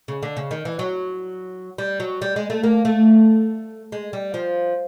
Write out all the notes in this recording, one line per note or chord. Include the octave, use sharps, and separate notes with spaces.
C#3
D3
C#3
D#3
E3
F#3
G3
F#3
G3
G#3
A3
A#3
A3
G#3
G3
F3